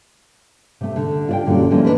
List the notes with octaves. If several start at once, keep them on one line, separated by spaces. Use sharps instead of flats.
C3 A3
D3
F4 D5 G5
F#2 A#2 D3 F#3 G3
D3 E3 F3 A#3 C#4 D4
C#4 D4 F#4 A#4 B4 D#5